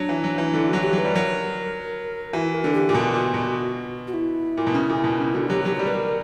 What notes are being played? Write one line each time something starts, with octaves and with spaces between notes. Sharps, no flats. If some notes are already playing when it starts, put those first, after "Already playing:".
Already playing: F#3 D4
E3
F#3
E3
D3 E4
F#3 F#4
G4
F#3
B4
G3
F#3 A#4
E3 F#4
A#4
D3
G4
A#2
B2 F#4
A#2
B2
F#4
E4
A#2
B2
C#3
A#2
B2
C#3
D3 F#4
F#3 G4
F#3 G4
F#4
G3 G4
B4
A#4